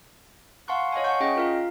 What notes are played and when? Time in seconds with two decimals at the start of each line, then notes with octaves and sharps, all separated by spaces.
0.68 F5 F#5 A5 C6 C#6 F#6
0.92 C#5 D#5 F5 G#5
1.04 F#5 A5 C#6 G6
1.20 C#4 G#4 D#5 G5
1.36 F4 A#4 F5